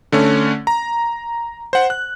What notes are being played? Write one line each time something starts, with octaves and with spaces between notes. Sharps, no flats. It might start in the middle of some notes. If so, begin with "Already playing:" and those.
D3 A3 C#4
A#5
C5 F#5
F#6